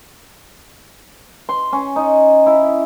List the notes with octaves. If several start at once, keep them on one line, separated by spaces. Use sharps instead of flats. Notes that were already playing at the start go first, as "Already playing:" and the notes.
C6
C#4
D#4
E4